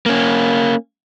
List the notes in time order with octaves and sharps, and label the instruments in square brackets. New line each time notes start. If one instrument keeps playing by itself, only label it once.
[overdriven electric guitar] A#3 C#4